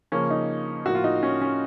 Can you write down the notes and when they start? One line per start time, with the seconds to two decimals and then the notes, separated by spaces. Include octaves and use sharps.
0.12 C#3 F3 A#3 C#4
0.30 D#4
0.86 A2 F3 A#3 F#4
0.95 F4
1.04 D#4
1.23 C#4
1.41 C#4